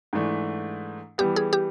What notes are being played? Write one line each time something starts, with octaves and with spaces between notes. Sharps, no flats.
G#2 E3 A3 D4
E3 G3 B3 G4
G#4
G4